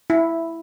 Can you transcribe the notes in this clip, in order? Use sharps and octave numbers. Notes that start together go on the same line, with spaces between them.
E4